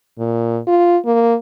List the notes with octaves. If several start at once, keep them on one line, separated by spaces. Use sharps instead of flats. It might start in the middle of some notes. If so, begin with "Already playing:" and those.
A#2
F4
A#3